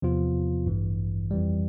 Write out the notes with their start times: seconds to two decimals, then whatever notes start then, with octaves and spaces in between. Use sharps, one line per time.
0.02 E2 C3 F3 B3 F4
0.66 A1 G2 E3
1.31 F2 E3 G3